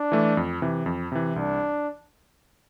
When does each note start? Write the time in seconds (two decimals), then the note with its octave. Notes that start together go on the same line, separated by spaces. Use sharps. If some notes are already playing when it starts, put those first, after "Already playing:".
Already playing: D4
0.12 E3 A3
0.37 F2
0.62 C3 E3
0.86 F2
1.12 C3 E3
1.36 C2 D4